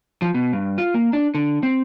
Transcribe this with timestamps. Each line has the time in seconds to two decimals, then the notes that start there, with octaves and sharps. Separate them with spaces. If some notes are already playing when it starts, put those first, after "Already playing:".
0.22 F3
0.34 B2
0.53 G2
0.78 F4
0.94 A#3
1.13 D4
1.35 D3
1.63 C4